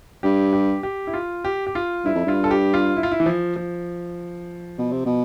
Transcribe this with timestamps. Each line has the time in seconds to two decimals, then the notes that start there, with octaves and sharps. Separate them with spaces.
0.23 G2 G4
0.53 G4
0.83 G4
1.07 E4
1.14 F4
1.45 G4
1.67 G4
1.75 F4
2.05 G2 E4
2.15 F2
2.26 G2 F4
2.44 A4
2.51 G4
2.74 F4
2.97 E4
3.03 F4
3.11 E4
3.20 E3
3.26 F3
3.56 F3
4.78 B2
4.92 C3
5.06 B2